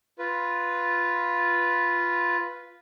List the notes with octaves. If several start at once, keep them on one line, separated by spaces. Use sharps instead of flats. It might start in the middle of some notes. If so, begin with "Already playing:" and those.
F4 B4